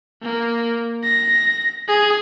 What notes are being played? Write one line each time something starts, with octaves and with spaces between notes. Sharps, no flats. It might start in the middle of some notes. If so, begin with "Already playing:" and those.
A#3
A#6
G#4